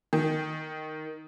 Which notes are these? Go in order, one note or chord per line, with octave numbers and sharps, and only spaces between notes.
D#3